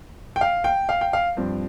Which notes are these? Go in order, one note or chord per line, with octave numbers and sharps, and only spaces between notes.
G5
F5
G5
F5
G5
F5
G2 F3 C4